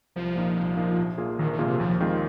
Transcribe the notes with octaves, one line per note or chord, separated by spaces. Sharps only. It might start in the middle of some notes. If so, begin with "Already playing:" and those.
C2 F3
A#2 A#3 D#4
C2
A#2 A#3 D#4
A#1
A#2 A#3 F4 G#4
A#1 D#3
D#3
A#2 A#3 F4 G#4
C3
D#2 F3
D#3 G#3 C4 F4